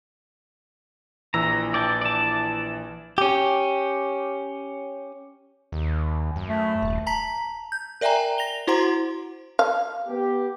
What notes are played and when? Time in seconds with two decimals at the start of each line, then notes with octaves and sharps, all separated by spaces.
1.34 A#1 E3 A#5 E6
1.74 D5 G5 A5
2.01 D5 A5
3.18 C#4 G4
5.72 D#2
6.36 F#2
6.49 A3
6.82 D#1
7.07 A5 A#5 B6
7.72 G6
8.01 A#4 D5 E5 G5 G#5 A#5
8.38 A#6 F7 G7
8.67 E4 F#4 C5 F#5 A#5 C6
9.59 F5
10.07 B3 G4